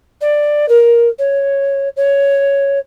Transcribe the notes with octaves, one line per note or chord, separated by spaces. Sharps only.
D5
A#4
C#5
C#5